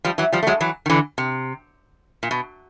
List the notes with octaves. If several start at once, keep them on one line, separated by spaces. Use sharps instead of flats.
F3 G3
E3 F#3
F3 G3
A3
F#3 G#3
E3 F#3
D#3
D3 E3
C3
A#2
B2